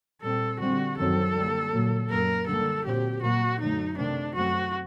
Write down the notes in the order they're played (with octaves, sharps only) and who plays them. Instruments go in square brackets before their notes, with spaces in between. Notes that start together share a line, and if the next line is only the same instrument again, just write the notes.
[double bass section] A#2 G3 C4 [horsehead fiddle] A4
[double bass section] D3 G3 C4 [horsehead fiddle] F#4
[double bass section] F#2 D#3 F#3 C4 [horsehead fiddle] A4
[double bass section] D3 G3 A#3
A#2 F#3 A#3
[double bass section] F#2 F#3 A#3 [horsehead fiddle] A#4
[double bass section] D3 G3 A#3 [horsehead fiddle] A4
[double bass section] A#2 F#3 C4 [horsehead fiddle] G4
[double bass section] A#2 F#3 A#3 [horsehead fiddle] F#4
[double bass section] F#2 D3 F#3 A3 [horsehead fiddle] D#4
[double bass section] C3 D#3 A3 C4 [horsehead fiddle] D4
[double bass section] F#2 F#3 A3 C4 [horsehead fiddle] F#4